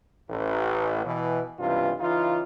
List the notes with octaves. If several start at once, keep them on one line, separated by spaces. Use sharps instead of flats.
A1
B2 E3
C#2 G2 C3 E3 F4
C#3 E3 D#4 F4